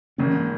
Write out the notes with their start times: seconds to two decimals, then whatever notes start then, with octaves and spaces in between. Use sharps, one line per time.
0.18 G#1 G#2 C#3 E3 A#3 C#4